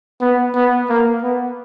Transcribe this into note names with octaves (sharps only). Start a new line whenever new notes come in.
B3
B3
A#3
B3